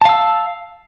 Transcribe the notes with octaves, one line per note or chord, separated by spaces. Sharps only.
F5 A5 E6